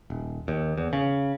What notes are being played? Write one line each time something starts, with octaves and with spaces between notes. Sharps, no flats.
D#1
D#2
E2
C#3